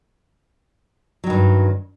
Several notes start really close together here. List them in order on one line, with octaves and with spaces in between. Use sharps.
F#3 D#3 G2